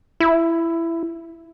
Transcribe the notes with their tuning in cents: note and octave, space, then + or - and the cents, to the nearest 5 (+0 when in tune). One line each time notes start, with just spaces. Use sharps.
E4 +15